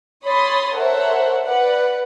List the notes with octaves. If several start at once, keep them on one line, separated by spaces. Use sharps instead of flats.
C#5 B5 C6 D#6 A6
A4 A#4 C5 C#5 E5 F#5
B4 D5 F#5